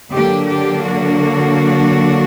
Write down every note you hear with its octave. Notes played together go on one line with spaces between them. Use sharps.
D3 F#3 A#3 D4 G4
G4
F#4